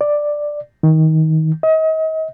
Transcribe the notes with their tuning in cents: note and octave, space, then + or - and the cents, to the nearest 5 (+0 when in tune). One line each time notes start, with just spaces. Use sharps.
D5 +5
D#3 +25
D#5 +35